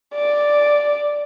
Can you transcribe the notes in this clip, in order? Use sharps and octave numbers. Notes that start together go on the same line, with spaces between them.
D5